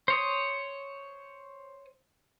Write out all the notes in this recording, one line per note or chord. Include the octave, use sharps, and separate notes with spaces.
C5 C#5 D#6